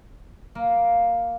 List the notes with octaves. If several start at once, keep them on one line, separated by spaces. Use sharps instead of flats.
A#3